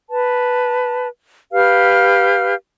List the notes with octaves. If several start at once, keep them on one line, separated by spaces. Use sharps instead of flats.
B4 A5
G4 B4 F5 F6